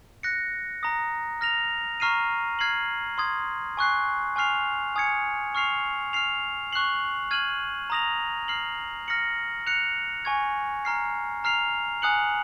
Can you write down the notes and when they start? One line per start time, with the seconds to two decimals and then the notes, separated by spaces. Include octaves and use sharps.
0.23 F#6 A#6 C#7
0.83 A#5 D#6 A#6
1.41 F6 A#6 F7
2.00 A#5 C#6 F6 C7 D#7
2.59 F6 G#6 C7 F#7
3.18 C6 D#6 G#6
3.77 G#5 C#6 F#6 C7
4.36 G#5 C#6 F6 C7 F7
4.96 G#5 D#6 G#6 C#7
5.55 C#6 F6 C7 F7
6.13 F6 C7 F7
6.72 C#6 F#6 C7 F#7
7.31 F6 G#6 D#7 F#7
7.90 A#5 D#6 A#6 F7
8.48 F6 C7 F#7
9.08 F6 A#6 C#7 F#7
9.66 F#6 C#7 F7
10.25 G#5 C#6 G#6
10.85 A#5 F6 C7
11.44 A#5 F6 C7 F7
12.02 G#5 D#6 F#6 C#7 F#7